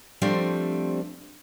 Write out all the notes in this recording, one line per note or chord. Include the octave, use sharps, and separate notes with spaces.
F3 G3 A3 C4 D4